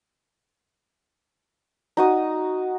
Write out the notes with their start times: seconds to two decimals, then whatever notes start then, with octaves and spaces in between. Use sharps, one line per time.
1.97 D#4 F#4 D#6